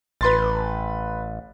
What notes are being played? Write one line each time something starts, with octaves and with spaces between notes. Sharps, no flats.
A1 B4 C6 A6